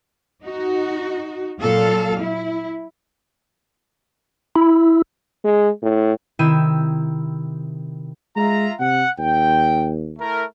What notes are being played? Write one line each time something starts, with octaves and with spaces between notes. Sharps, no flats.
D#4 F#4
A#2 F#3 A4 F5
E4
E4
G#3
A2
C3 D#3 C4 E4 E6 D#7
G#3 F4 E5 A#5
C3 F#5
D#2 G5
A3 E4 A#4